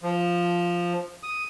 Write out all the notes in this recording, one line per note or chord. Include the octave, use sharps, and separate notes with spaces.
F3
D#6